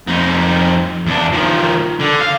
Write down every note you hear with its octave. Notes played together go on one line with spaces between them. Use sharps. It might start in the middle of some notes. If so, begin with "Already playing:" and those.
F2 D#4
E2 D4
D#3 F3
D3
F5